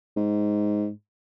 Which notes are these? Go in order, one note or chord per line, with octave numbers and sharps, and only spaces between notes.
G#2